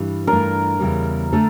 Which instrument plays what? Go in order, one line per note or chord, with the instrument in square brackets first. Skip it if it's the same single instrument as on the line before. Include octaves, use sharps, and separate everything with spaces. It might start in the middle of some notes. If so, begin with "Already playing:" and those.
Already playing: [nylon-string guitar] G2 E3 G3
[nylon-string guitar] G2 E3 A3 D4 F4 [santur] A#4
[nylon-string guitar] E2 C#3 G3
D3 A3 D4 A4